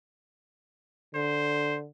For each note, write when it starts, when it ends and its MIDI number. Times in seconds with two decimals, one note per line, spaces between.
1.15 1.88 50
1.15 1.77 72